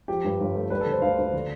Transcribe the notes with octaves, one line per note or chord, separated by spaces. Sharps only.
F3 G4
G2
G1
A3
G3 B4
A4
D3
C5
D2 F5
D2
D3